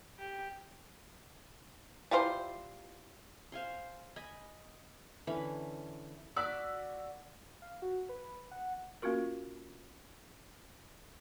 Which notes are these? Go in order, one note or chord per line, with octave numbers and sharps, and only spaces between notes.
G4
G3 E4 F4 C5
C5 F5 G#5 C6
D#5 G#5 B5
D3 E3 C#4 B5
F#4 D5 D6 E6 B6
F5
F#4
B4
F#5
A#3 C#4 F4 F#4 A#4